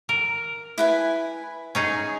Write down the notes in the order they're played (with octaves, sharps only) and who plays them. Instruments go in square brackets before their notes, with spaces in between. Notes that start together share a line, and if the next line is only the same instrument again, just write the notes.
[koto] A#4
[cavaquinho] E4 B4 G#5
[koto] C#4 D#4 G#4 [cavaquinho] G#5